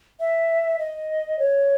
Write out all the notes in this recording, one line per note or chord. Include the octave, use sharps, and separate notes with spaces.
E5
D#5
C#5